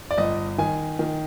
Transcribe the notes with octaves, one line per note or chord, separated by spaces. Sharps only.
D5
G1 D#5
D#3 G#5
D#3